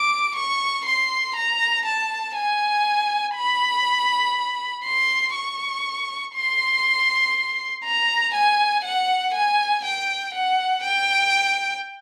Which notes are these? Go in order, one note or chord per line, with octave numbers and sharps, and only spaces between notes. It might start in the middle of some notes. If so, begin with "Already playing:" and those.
Already playing: D6
C#6
C6
A#5
A5
G#5
B5
C6
C#6
C6
A#5
G#5
F#5
G#5
G5
F#5
G5